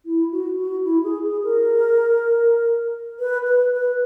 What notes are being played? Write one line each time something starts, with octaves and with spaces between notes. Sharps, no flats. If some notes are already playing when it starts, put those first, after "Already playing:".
E4
F#4
F#4
E4
G#4
G#4
A#4
B4
B4
B4